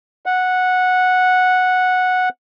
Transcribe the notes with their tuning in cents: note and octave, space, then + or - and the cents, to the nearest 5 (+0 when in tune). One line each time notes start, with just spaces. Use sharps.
F#5 -10